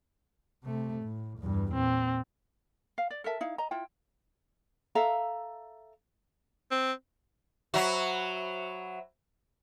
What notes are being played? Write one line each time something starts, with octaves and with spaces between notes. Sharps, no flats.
C3 A3
A2
E2 G2
A#2 C4
F5
D5
A4 A#4 E5 A5
D#4 E4 F5
D#5 A#5
E4 F4 G5
A4 E5 F5 A#5
C4
F#3 F#4 C5 E5 B5